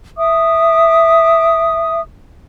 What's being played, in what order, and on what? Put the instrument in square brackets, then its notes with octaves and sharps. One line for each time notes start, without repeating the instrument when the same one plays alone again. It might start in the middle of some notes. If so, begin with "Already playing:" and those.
[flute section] E5 D6 D#6